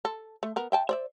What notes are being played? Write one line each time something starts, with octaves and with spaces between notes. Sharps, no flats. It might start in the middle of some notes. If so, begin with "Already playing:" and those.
A4
A3
B3 A#4
E5 G5 A5
C5 D5 E5